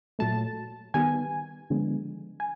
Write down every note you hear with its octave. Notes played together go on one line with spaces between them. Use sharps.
A#2 F#3 A3 A5
D#3 G3 B3 G#5
D3 F3 G#3 B3
G#5